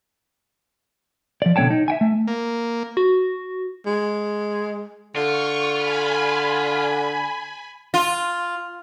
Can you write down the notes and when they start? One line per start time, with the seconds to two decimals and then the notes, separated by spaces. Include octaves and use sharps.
1.42 F3 D5
1.56 B2 D3 A#3 C#5 G5 A5
1.70 D#4
1.88 E5 G5 G#5
2.01 A3
2.27 A#3
2.97 F#4
3.86 G#3
5.16 D3 F4 C#6
5.75 G#5 B5
7.94 F4